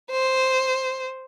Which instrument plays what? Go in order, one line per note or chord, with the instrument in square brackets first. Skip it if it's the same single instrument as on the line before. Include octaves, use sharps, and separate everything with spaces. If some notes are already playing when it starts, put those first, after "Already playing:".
[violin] C5